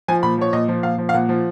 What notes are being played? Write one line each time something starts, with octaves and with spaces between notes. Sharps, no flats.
F3 G#5
A#2 B5
F3 C#5
A#2 D#5
F3
A#2 F5
F3
F5
A#2 F#5
F3